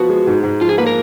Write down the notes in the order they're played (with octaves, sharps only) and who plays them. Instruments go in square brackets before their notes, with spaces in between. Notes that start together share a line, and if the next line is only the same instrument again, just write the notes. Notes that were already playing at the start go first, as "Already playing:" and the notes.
Already playing: [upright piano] F3 B3 [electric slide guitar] F#4
[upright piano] G#3
G#2
G#2
[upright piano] F3 [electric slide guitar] F4
[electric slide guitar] G#4
[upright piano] A#3 [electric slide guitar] B4
[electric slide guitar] A#4